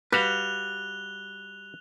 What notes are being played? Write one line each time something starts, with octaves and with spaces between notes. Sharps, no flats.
G3 F#4 B4 F5 F#6 F7 G7